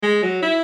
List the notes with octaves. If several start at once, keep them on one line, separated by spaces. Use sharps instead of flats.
G#3
F#3
E4